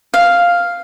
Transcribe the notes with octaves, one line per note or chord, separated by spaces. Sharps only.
F5